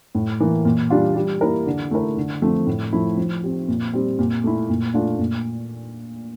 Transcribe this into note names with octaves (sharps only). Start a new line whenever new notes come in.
A2
E3 A#3
A#2
G3 D4 F4
G3
A#3 E4 A#4
D3
A3 E4 A#4
D3
F3 A3 C4
A2
F3 A3 E4
F3
C4 G4
A#2
G3 C4
A#2
A3 E4
A#2
A3 D4 F4
A#2